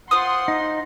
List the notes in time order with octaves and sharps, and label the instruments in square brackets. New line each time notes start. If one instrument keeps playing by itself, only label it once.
[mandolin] F4 C5 D#6 [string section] F#5 C6
[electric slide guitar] D#4